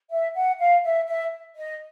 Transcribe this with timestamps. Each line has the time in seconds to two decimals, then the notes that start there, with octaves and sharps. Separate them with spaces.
0.10 E5
0.34 F#5
0.58 F5
0.83 E5
1.07 E5
1.56 D#5